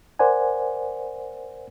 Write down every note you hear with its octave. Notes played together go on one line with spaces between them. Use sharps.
A#4 C5 D5 F#5 G#5